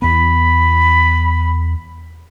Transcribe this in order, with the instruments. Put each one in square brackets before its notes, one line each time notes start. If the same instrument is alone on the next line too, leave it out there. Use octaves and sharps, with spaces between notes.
[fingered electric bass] E2 B3 [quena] B5